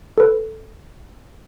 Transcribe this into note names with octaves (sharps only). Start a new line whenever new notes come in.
A4 B4